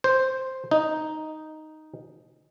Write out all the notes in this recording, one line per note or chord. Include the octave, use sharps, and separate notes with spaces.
C5
D#4